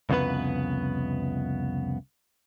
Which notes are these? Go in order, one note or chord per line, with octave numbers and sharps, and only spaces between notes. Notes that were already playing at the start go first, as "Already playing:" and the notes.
C2 F2 C#3 B3 B4